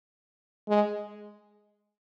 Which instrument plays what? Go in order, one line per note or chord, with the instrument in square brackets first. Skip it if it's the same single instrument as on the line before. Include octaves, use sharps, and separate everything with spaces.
[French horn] G#3